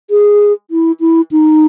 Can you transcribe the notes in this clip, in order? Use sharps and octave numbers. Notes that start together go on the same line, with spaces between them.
G#4
E4
E4
D#4